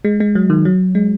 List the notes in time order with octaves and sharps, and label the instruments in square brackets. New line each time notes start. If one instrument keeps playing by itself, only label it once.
[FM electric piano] G#3
G#3
F#3
D#3
F#3
G#3